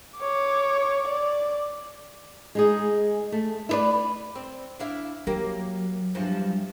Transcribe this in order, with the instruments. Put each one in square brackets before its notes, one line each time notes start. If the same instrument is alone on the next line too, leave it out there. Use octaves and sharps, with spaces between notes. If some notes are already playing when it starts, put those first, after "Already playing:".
[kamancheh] C#5 D6
D5
[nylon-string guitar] G#3 D#4 G#4
A3
E4 B4 D5
[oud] C4
D4 E4 F5
[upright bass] F#3 [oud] A#3 G4
[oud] E2 G2 F3